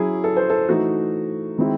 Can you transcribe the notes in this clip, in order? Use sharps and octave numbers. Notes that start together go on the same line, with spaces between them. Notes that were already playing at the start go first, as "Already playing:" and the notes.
Already playing: F#3 C#4 E4 G#4
A4
C5
A4
E3 A3 D#4 F#4
D#3 G#3 C4 E4